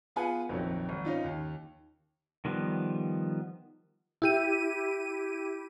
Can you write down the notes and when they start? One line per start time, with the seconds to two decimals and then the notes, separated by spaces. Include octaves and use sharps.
0.16 B3 F4 G#4 B4 F#5 G#5
0.49 A#1 F2 D#3 F#3
0.89 G#1
1.05 C#4 D#4 F4
1.24 D#2
2.45 D#3 F3 G3 B3
4.22 E4 G4 D#7